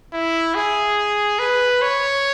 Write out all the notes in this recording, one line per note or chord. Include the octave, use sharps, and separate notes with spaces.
E4
G#4
B4
C#5